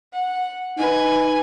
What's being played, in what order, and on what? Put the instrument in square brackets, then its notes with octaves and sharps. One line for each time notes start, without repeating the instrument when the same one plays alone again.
[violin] F#5
[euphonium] D#4 [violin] B4 G#5